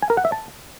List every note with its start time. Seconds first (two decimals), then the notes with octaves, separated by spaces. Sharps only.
0.02 G#5
0.10 A#4
0.17 F#5
0.25 E5
0.32 A5